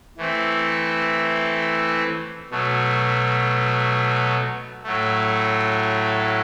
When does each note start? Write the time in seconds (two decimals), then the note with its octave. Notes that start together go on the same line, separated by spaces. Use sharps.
0.17 E3 A3 C4
2.51 B2 F#3 A3
4.84 A2 F#3 A3